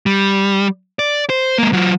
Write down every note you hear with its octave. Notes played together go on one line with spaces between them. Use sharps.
G3
D5
C5
G#3 A#3
F#3 F4